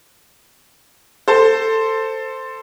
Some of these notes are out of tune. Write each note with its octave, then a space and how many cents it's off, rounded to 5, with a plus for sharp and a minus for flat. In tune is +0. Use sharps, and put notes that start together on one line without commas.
A4 +15 C5 +0